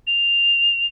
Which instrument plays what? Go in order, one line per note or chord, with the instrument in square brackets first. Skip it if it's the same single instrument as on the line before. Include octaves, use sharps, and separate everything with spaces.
[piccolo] F7